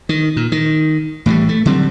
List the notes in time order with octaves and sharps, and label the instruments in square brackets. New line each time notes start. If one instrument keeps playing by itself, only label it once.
[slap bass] D#3
A#2
D#3
A2 E3 F#3 G3
A3
D3 F#3 G3 C4